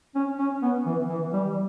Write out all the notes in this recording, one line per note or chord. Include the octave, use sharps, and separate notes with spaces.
C#4
C#4
B3
E3
E3
G3